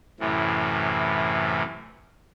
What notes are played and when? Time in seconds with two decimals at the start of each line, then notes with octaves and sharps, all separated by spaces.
0.20 F#2 A2 C3 E3